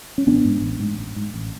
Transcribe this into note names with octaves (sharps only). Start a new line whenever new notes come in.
C#4
A1 B3 D4
G#2
A1
G#2
A1
G#2
A1